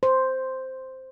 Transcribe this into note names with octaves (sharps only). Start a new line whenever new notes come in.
C5